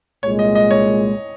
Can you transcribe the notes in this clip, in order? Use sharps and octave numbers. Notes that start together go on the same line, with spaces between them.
C2 A#2 G#3 C#5
D#5
D#5
C#5